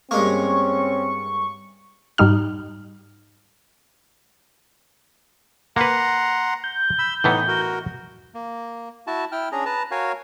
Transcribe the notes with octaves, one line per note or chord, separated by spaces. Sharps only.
G2 G#3 A#3 C4 C#4 C#6
G#2 G3 D#4 F6
A#3 B4 F#5 A#5 C6
G6
B5 E6
A2 E3 B3 D#4
F#4 A#4
A#3
E4 F#4 A5
E4 G5 F6
C#4 D4 G#4 A#5
B4 A5 A#5
F#4 A#4 C#5 F5 G#5